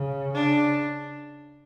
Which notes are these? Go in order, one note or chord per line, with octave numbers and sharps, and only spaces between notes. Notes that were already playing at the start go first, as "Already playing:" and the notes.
Already playing: C#3
D4